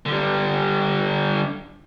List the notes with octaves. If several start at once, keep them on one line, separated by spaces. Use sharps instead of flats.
D3 G3